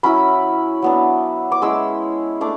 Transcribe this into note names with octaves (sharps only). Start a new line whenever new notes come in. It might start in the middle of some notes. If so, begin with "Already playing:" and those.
F#3 C#4 E4 B5
F#3 B3 D4
D6
G#3 C#4 E4 E6
A3 D4 D6